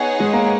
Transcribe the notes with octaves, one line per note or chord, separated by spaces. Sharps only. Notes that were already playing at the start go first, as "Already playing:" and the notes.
Already playing: B3 D#4 G#4 C#5 F#5
G#3
A#3